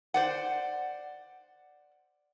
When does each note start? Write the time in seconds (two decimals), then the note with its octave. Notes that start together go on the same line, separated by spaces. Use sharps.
0.14 C5 D5 F#5